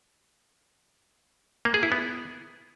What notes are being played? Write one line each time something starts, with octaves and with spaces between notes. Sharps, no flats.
A#3
G#4
E4
B3